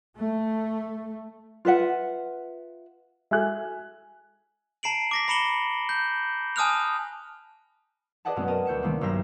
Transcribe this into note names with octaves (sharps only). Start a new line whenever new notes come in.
A3
F4 B4 E5 F#5
G#3 F#4 A4 E5 G#5 F#6
A5 A#5 C7 D7 F#7
D6 A#6 B6
A#5 B5 C#7 E7 F#7 G7
G6
G#5 A5 D#6 F6 F#6 F7
G#4 B4 D5 D#5 F#5 A5
F#2 B2 G#3 A3 B3 C#4
A#4 D5 D#5 G5 A5
D2 G6 C#7 E7
C3 D#3 G3 A3 A#3
B1 G2 C5 E5 A#5 A#6